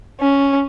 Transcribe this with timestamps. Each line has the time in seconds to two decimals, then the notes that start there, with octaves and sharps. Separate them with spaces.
0.21 C#4